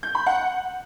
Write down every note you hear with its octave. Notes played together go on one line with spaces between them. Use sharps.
G6
B5
F#5